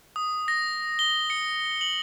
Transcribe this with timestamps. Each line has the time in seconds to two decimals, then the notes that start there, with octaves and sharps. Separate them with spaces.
0.16 D#6
0.48 A#6
0.99 G7
1.30 C#7
1.81 F#7